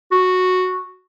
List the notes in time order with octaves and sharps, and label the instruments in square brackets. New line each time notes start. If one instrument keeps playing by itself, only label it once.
[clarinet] F#4